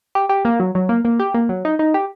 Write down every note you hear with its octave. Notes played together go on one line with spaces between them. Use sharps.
G4
G4
A#3
F#3
F#3
A#3
A#3
G4
A#3
F#3
D#4
D#4
G4